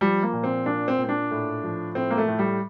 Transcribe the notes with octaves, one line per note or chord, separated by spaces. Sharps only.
F3 G3
A#3
A#2
C4
A#2 D4
C4
A#2
C4
D4
A2
F3
A2 C4
A#3
A3
A2
G3